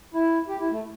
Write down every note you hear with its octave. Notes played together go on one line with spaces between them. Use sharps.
E4
G4
E4
A3